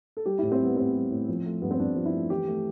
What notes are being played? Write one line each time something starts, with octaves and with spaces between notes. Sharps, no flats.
A4
G3 G4
A2 E4
C4
G3 B3
A2 C4
G3
A2
F3
A3
G2 B3
C4
G2 D4
F3
E4
A3
E3 G4
A3